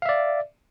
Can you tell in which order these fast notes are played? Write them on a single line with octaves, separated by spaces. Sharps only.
F5 E5 D5